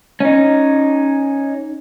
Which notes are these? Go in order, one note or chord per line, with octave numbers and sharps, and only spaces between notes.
C#4 D#4